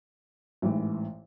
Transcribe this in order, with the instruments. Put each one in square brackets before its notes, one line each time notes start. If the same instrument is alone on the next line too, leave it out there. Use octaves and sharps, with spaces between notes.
[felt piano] A1 G#2 E3